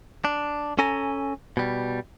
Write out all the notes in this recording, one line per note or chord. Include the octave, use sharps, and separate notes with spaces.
D4
C#4 A4 G#5 A#5
B2 G3